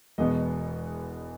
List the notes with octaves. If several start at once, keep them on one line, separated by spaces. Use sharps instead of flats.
E1 E2 B2 G#3 B3 D#5